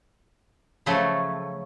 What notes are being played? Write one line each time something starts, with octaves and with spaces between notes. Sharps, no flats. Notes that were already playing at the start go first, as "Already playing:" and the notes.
C#3 F3 F#3 A3 C#4